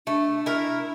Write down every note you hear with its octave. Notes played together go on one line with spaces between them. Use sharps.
A3 D4
E4 A#4